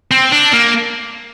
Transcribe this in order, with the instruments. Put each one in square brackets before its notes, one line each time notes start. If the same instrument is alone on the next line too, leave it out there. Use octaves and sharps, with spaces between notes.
[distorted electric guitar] C4
D4
A#3